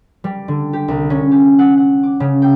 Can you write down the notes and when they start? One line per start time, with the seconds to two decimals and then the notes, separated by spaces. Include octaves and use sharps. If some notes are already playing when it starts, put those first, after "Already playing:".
0.24 G3
0.48 D3
0.73 G4
0.88 C2
1.10 C#4
1.31 G4
1.59 F#5
1.77 F#5
2.03 D6
2.20 C#3
2.42 G5